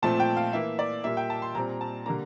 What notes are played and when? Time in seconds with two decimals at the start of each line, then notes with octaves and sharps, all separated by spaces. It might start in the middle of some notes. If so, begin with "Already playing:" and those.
0.02 A#2 F3 A3 C4 A5
0.20 G5
0.37 F5
0.53 E3 A#3 E5
0.79 D5
1.04 A#2 G3 A#3 E5
1.17 G5
1.30 A5
1.42 C6
1.55 A#2 G3 C4 A#5
1.81 A5
2.06 D3 G3 A#3 A#5